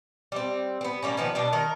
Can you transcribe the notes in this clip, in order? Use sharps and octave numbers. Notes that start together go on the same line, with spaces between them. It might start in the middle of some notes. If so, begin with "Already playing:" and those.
G3 C4
B3 C4
G3 A#3 C#4
D#3 F3 B3
B2 G3 D4
D#3 A#4